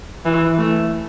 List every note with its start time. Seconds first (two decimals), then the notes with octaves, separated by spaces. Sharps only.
0.25 E3
0.58 A3